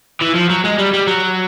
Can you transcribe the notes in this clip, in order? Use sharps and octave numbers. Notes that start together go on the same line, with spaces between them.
E3
F3
F#3
G#3
G3
G3
F#3